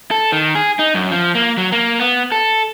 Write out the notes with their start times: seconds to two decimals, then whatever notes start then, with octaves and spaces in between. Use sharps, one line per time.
0.11 A4
0.32 D#3
0.55 G#4
0.79 D#4
0.94 F#2
1.11 F3
1.35 A#3
1.57 F#3
1.72 A#3
1.99 B3
2.32 A4